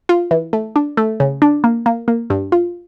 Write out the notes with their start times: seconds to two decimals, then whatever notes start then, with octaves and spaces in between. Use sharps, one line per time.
0.09 F4
0.31 E3
0.53 A3
0.76 D4
0.97 A3
1.20 C#3
1.42 D4
1.64 A#3
1.86 A#3
2.08 A#3
2.30 G2
2.52 F4